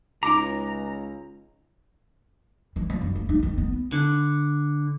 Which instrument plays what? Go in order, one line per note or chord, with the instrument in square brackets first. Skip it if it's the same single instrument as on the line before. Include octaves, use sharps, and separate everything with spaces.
[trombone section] C#2 [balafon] D#4 D6 [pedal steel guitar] A#5
[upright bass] E3
F3
F#2
A#3
D#4
D#3
B3
[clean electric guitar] D3